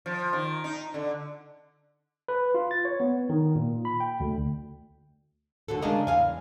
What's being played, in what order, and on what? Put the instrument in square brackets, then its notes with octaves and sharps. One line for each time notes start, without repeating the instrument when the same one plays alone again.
[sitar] F3
D#3
D#4
D3
[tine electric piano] B4
F4
A6
C#5
B3
D#3
A#2
B5
G5
D2
[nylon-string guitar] D#2 D3 F#4 A4
C#3 G#3 D4 A#4 D#5 A5
E2 F5 G#5